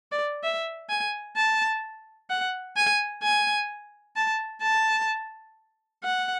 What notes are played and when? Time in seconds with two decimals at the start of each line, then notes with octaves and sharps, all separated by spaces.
0.12 D5
0.44 E5
0.90 G#5
1.36 A5
2.30 F#5
2.76 G#5
3.23 G#5
4.16 A5
4.63 A5
6.04 F#5